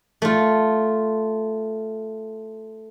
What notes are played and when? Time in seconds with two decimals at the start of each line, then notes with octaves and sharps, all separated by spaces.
0.22 A3 F4